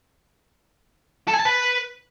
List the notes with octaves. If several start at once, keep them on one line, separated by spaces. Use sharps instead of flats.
A4
G#5
A5
B4